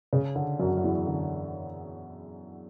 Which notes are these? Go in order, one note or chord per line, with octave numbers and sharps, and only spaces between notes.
C#3
D3
F#2 F#3
F#3
E2 E3
D3